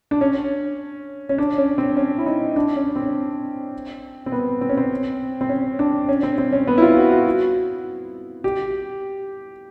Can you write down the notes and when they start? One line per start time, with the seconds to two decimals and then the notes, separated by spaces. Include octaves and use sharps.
0.11 D4
0.21 C#4
1.29 C#4
1.38 D4
1.58 C#4
1.78 C4
1.97 C#4
2.18 E4
2.26 D#4
2.56 D4
2.76 C#4
2.96 C4
4.26 C4
4.32 B3
4.61 C4
4.69 C#4
4.77 C4
5.41 C4
5.49 C#4
5.79 D4
6.09 C#4
6.23 C4
6.38 C4
6.52 C#4
6.67 B3
6.78 E4
6.82 F4
6.97 F#4
7.11 F#4
8.44 G4